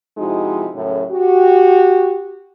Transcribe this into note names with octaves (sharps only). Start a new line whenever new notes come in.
C3 F3 G#3 D#4 E4 F#4
F#2 A2 C#3
F#4 G4